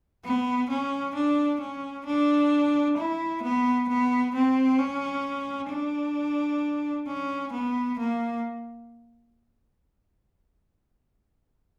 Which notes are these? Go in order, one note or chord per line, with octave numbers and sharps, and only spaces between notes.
B3
C#4
D4
C#4
D4
E4
B3
B3
C4
C#4
D4
C#4
B3
A#3